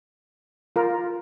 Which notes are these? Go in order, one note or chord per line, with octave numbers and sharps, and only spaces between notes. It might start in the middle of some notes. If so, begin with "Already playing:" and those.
F4 A#4